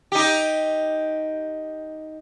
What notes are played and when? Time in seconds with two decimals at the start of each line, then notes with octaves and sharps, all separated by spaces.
0.12 D#4 G4